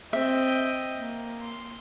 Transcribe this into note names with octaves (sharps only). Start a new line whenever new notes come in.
C4 D#5 E5 G5
A#3
C6 C7